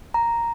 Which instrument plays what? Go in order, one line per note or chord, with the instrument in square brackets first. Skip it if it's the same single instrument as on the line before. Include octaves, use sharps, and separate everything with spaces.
[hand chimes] A#5